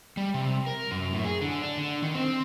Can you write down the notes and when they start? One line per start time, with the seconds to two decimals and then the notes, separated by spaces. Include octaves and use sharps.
0.17 G3
0.34 C3
0.67 A#4
0.91 F#2
1.13 A2
1.25 G#4
1.41 D3
1.62 D4
1.78 D3
2.02 D#3
2.15 C4